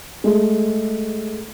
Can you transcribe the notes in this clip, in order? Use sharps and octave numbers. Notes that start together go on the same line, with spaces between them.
G#3 A3 G#4